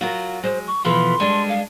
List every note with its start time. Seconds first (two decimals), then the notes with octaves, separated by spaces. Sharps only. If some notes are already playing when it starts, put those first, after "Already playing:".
0.01 F#3 F4 F#4 A#4
0.44 G#3 C5
0.67 C#6
0.85 B2 E3 F3 A4 B4 F5 C6
1.20 G3 G#3 D4 A4
1.49 F5